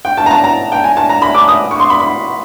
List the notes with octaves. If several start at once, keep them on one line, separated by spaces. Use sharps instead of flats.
G5
A5
A#5
A5
A#5
G5
G#5
A5
A#5
B5
D6
D#6
C#6
C6
B5
B5